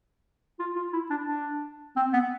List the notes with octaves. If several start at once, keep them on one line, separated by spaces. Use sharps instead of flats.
F4
F4
E4
D4
D4
C4
B3